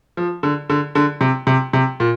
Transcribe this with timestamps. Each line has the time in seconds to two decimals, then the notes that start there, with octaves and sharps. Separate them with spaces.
0.17 F3
0.43 D3
0.70 D3
0.95 D3
1.21 C3
1.47 C3
1.73 C3
2.00 A#2